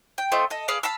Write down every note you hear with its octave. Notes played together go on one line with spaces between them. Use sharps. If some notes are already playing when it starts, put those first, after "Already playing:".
G5
A3 C4 F4 D#5
A4 D#5
G#4 B4 D5 F5
F5 A5 B5 E6